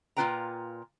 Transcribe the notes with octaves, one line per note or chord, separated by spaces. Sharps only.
A#2 D#4 F4 B4 G5 A#5